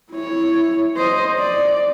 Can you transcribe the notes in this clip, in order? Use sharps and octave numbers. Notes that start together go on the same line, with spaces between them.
E4 C#5
C5 D#5
D5